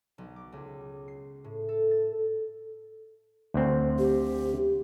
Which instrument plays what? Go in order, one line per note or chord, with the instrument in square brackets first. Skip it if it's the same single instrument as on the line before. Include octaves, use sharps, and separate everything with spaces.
[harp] B1
D6
C#2
C7
A2
A4
A6
[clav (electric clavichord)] D2 C4
[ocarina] G4